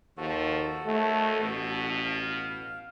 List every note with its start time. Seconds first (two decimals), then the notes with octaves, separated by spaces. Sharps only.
0.18 D#2 F3 F#4 A4
0.86 D#2 A3
1.41 A1 B2
2.04 F5